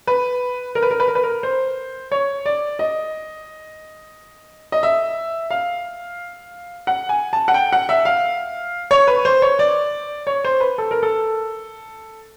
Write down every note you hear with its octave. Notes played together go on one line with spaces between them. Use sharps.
B4
A#4
B4
A#4
B4
A#4
B4
A#4
C5
C#5
D5
D#5
D#5
E5
F5
F#5
G#5
A5
F#5
G5
F#5
E5
F5
C#5
B4
C5
C#5
D5
C#5
C5
B4
A4
A#4
A4